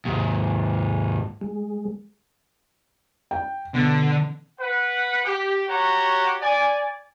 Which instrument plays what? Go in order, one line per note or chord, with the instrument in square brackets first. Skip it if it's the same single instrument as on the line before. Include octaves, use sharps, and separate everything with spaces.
[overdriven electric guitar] D#2 G#2
[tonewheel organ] G#3
[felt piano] G5
[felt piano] B2 [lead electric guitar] D3
[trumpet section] B4 F#5
G4
F#4 G4 C#5 F#5 A#5 C#6
D5 G#5